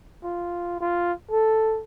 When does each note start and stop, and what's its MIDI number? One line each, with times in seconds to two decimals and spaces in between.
0.24 0.78 65
0.80 1.12 65
1.31 1.82 69